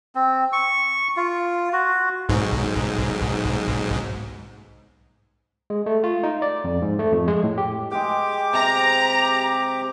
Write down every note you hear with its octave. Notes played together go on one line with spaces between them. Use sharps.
C4
C#6
F4
F#4
B1 G#2
G#3
A3
F4
D#4
D5
F2
G#2
A3
F2
G#3
A2
G4
G#3 G4 G#4 G5 D6
C3 A#5